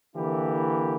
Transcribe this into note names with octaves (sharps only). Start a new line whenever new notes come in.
D3 E3 A#3 E4 G4